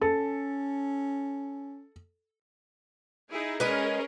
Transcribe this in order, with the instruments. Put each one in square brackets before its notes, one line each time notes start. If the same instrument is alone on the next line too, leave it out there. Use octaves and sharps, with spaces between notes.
[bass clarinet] C#4 [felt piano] A4
[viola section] D#4 E4 G#4
[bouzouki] G#3 B4 [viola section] C#4 G#4 A#4